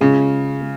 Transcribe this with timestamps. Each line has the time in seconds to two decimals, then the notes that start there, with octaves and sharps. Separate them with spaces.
0.01 C#3 G#3 C#4 F4
0.62 G#3